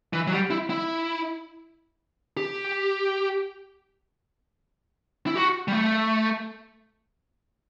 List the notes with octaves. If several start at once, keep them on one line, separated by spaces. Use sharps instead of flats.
E3
F#3
G3
E4
E4
G4
E4
F#4
G3
A3